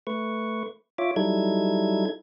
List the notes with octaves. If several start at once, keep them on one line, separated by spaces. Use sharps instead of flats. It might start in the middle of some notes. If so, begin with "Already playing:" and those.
A3 B4 C#6
F4 C#5 E5 D6
F#3 G3 D#4 E4 A4 G#6